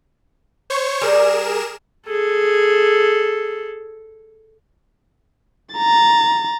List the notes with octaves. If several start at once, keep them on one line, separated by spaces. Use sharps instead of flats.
C5 C#5 C#6
G3 G#4 A#4 E7
G#4 A4
A#5 A6